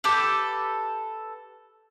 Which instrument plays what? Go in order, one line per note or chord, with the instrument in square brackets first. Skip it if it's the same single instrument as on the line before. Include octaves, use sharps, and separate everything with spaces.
[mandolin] G4 A4 B4